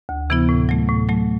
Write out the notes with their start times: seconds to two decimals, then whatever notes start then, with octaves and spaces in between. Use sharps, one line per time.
0.09 D2
0.30 C3 E3 B3 E4
0.49 A2
0.69 F#3 A3
0.89 A2
1.09 F#3 A3